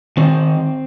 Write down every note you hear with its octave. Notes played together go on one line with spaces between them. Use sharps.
D#3 C4